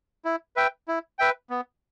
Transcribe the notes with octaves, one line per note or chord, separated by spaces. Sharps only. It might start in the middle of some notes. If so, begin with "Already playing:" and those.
E4
B4 E5 G5
E4
B4 E5 G5
B3